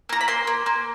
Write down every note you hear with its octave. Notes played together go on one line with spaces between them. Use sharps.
A#3 A#5
B5
A#3 C6
A#3
A#3